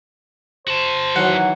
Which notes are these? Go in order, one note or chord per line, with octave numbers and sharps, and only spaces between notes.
F#4 C5 A5
D#3 E3 F#3 F#5